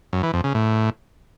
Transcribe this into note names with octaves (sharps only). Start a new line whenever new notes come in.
F#2
E3
F2
C#3
A2